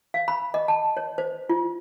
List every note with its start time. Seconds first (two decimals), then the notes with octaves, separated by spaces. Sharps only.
0.14 F5
0.28 B5
0.54 D#5
0.68 A5
0.97 C#5
1.18 C5
1.49 F4